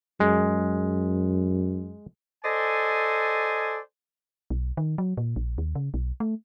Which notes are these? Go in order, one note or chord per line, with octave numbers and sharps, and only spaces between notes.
F#2 G#3
A4 C5 D5 D#5 G#5
B1
D#3
F#3
A#2
A#1
D#2
C#3
B1
A3